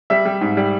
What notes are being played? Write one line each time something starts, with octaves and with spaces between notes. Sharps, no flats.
G3 E5
G3
G#2
G3